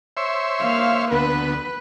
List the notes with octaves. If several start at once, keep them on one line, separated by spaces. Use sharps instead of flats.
C5 C#5 E5
A#3 F5
D2 B3 B4